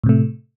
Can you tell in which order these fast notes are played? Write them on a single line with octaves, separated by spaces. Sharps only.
A2 C3 A3